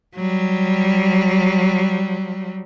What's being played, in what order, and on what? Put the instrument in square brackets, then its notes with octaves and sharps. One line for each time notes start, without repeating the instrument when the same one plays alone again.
[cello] F#3 G3